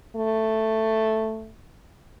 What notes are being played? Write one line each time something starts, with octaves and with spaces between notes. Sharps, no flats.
A3